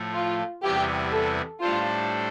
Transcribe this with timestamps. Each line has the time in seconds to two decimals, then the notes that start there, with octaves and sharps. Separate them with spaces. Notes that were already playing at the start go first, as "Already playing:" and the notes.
Already playing: A2 F3 A3
0.14 F4
0.63 E2 C3 G3 B3 E4 G4
1.12 A4
1.61 A2 G3 D4 F4 A4 C5